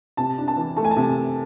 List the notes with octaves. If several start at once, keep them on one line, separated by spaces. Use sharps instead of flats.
C3 A5
D4
A5
E3
A3 A5
G#5
A5
C3